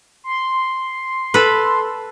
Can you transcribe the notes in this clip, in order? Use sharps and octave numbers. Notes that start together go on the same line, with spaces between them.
C6
A4 B4